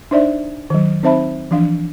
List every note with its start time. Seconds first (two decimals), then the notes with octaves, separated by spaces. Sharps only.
0.11 D4 D#4 C5 D5 E5
0.70 D#3 F#3
1.03 C4 D#4 C5 E5 A5 B5
1.51 E3 F3 D4 F5